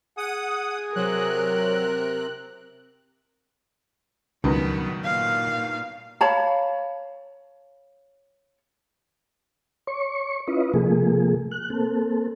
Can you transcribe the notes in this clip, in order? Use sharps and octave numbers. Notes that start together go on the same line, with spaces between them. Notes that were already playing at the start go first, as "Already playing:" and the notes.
G#4 F#5 D#6
C3 F#3 C4 A#4 F#6
C#2 G2 B2 D#3 F#3 B3 B4 A#5
A#2 F5
C#5 F5 A5 B5
C#5 C#6
C#4 E4 F4 B4 D#5
C3 F3 A3 A#3 G#4
F#6
A#3 C4 A4